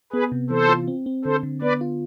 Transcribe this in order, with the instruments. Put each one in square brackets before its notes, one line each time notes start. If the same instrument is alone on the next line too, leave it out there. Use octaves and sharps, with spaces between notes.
[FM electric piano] B3 [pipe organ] G#4 B4
[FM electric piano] C3
[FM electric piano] E3 [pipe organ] A4 C5
[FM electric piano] F4
C4
C4
[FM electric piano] D3 [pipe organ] A4 C5
[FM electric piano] D3
[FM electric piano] B3 [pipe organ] B4 D5
[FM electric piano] F4